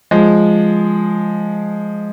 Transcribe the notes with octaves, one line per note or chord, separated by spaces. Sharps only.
F3 G#3